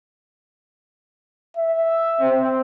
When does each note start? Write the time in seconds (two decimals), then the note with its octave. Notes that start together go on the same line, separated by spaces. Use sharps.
1.57 E5
2.21 C4